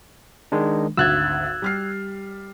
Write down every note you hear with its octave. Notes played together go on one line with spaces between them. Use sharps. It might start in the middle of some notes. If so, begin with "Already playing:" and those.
D#3 G#3 D4
G#1 D2 E6 F#6 G#6 A6
G3 F6 C7